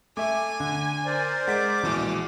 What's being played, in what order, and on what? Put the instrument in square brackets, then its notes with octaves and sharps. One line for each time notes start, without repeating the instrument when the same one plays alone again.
[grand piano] A3 E5 [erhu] G#5 [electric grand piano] D6
[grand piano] D3
[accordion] A#4 C5 D5
[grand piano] G#3 [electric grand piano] F#5 B6 D7 [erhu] D6
[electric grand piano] A#1 B2 G#3 [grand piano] E3